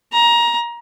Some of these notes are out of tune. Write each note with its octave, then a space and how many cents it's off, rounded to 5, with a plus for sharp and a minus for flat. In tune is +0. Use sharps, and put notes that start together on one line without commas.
A#5 +20